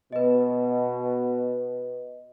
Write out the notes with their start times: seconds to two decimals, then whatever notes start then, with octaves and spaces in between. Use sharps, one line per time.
0.12 B2 B4 D#5